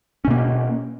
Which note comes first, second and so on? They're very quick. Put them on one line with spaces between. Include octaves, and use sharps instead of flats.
C#4 B2 A#3